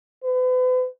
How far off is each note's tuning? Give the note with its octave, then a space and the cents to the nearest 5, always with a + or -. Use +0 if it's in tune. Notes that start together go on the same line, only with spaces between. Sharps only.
B4 +40